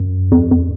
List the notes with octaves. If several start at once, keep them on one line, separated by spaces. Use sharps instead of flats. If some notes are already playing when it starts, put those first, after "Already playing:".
Already playing: F#2
F2
F2